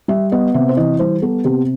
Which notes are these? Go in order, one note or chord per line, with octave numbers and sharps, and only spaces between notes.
G3 E5
B3 D#5
C3 E5
C5
E3 D#5
G3 C5
B3 A4
C3 G4